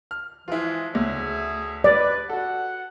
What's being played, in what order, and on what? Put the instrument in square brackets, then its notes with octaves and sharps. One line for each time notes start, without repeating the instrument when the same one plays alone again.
[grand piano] F6
[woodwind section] E3 F3 G#3 [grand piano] E4 F4
[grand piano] D2 C#3 [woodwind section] G#4 E5
[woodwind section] B4 [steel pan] D5
[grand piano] F#4 A4 [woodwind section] F#5